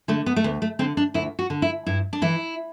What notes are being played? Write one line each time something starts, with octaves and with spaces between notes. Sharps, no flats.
D3 A3
B3
A3
D2 B3
A3
D3 C4
D4
D2 E4
F#4
D3
E4
G2 E4
D4
E3 E4